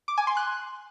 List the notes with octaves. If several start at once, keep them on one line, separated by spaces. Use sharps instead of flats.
D6
G#5
C6
F#6